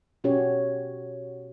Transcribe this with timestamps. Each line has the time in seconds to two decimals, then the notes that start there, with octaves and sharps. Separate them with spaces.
0.24 B2 C#4 F#4 G4 C#5